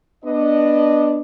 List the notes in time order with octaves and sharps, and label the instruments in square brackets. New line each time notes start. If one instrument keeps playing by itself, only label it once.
[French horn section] B3 D4 D#5